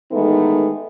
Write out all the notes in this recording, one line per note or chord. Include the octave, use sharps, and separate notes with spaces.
D#3 E3 G#3 A3 B3 D#4